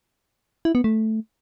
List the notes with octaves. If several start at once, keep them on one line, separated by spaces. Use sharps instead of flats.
E4
B3
A3